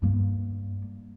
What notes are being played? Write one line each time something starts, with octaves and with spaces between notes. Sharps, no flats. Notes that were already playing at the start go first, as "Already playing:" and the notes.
G2 A#3